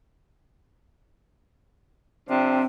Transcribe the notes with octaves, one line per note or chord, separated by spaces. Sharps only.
C3 F3 C4 D4